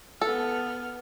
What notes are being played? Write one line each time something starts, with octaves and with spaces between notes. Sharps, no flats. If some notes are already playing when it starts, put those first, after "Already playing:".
B3 A4 F6